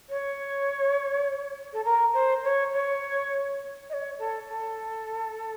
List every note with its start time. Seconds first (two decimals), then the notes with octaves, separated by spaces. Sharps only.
0.09 C#5
1.73 A4
1.85 A#4
2.14 C5
2.43 C#5
2.73 C#5
3.90 D#5
3.94 C#5
4.19 A4
4.48 A4